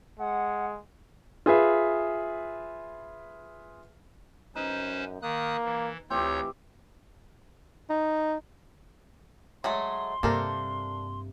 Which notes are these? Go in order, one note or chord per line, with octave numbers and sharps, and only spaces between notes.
G#3 F#5
F4 G#4 B4 E5
F#2 C#4 D#4 B4 C5
D#3 A#3 D#6 F#6
E3
D2 E3 C4 G4 C#5 G6
D#4
F#3 G#3 A3 C6
G2 C3 A#3 D4 A4 A#4 C5